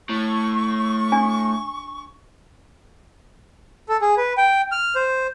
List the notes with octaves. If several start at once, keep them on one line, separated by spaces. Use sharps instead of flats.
A2 C#6
D4 G#5
A4
G#4
B4
G5
F6
C5